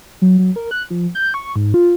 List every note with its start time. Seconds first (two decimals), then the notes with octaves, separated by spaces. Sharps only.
0.22 F#3
0.39 F#3
0.56 A#4
0.71 F#6
0.90 F3
1.15 G6
1.34 C#6
1.56 G#2
1.74 F4